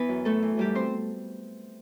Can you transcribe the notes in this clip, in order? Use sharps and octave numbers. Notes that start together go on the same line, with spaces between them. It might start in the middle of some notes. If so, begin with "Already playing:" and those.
Already playing: E3 B3 B4
F#2
E3 A3 A4
E3
F#2 G3 G4
C4 C5